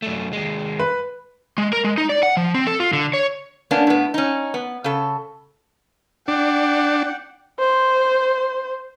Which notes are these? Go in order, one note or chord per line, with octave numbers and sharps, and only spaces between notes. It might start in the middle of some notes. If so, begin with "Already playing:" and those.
F#2 A3
D#2 G#3
B4
G#3
A#4
G#3
D#4
D5
F#5
F3
C4
A4
F4
D3
C#5
A#3 B3 C#4 D4
A2 B3
C#4 D#4
B3
C#3 A4
D4 F#5 G5
C5